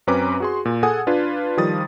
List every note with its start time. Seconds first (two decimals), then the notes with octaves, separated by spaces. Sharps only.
0.07 F#2 C4 C#4 B4 A#5 D6
0.40 F#4 G#4 C6
0.65 A#2
0.83 G#4 A4 F#5 G#5 D#6 G#6
1.07 D4 F4 B4
1.57 D#3 F3 G3 D#6 A6